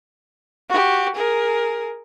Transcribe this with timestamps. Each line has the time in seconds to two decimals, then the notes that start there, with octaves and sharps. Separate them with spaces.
0.69 F#4 G4
1.15 G#4 A#4